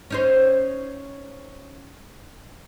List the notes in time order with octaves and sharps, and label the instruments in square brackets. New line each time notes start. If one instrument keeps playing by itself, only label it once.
[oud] C#4 D#4 C5